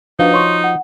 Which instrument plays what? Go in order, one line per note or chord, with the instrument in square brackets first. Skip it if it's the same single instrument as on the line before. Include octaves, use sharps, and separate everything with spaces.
[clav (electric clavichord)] F3 F#4 [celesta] D4 B4 F5 [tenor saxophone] D#4
[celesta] C#5 C6 C#6
F#5